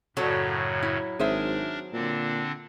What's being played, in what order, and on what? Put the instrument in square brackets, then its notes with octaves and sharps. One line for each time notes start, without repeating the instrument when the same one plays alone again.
[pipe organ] F#2 A2 C#3 [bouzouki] F#3 [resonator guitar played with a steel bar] F#4 A4 C#5
[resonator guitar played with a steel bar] E4
[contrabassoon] G#1 [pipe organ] D4 A#4 [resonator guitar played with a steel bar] G#4 C5 E5
[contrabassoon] A#2 [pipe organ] D3 C4 D4